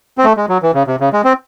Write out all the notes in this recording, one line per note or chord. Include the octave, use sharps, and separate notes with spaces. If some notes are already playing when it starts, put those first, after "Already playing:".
C4
A3
G#3
F#3
E3
C#3
C3
C#3
G#3
C4